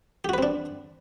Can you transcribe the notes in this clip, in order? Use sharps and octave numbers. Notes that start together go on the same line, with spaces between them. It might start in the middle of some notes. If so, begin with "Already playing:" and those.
C4 D4 F#4 G4 B4